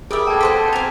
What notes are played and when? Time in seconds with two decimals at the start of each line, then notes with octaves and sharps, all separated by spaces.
0.11 G3 G#4 A#4 D5 E5 D#6
0.27 B2 A4 G5 A5 D6 G#6
0.41 D4 C5 F#5 B6
0.57 D#7
0.73 C4 F5 G#5 A#5 A6 F7